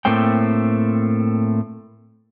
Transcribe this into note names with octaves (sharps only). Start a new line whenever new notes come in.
A2 A3 A#3 C4 G5